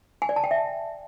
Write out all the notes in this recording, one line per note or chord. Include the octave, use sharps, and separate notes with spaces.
G#5
D5
A5
G5
E5